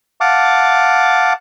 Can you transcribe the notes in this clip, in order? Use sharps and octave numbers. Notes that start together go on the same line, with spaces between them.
F5 F#5 A5 D6